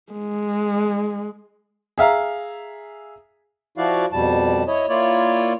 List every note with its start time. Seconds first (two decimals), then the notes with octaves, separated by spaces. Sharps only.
0.12 G#3
1.98 G#4 E5 F5 A#5
3.78 F3 E4 F#4 D5 F5
4.12 F2 B2 G3 A5
4.67 E4 C#5 D#5
4.89 A#3 E4 F4 C#5 D5